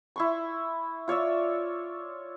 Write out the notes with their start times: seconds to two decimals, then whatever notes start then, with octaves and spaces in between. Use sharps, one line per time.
0.16 E4 C6 C#6
1.08 F4 C#5 D5 E5